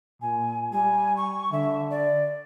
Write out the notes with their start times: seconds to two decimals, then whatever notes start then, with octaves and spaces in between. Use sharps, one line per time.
0.22 A#2 G#5
0.73 G3 G#5
1.17 C#6
1.52 D3 E5
1.91 D5